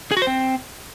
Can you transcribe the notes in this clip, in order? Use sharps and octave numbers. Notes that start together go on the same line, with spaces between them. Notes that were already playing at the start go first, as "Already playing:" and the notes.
G#4
F#4
C5
C4